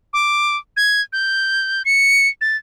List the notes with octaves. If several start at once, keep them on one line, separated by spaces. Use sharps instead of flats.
D6
G#6
G6
C#7
A6